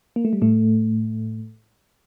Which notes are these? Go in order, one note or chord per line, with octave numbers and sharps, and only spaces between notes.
A#3
A3
G3
A2 A3